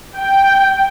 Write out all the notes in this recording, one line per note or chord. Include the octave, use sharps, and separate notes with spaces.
G5